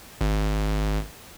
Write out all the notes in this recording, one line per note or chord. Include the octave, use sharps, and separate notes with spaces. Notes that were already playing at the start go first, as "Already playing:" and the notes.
G#1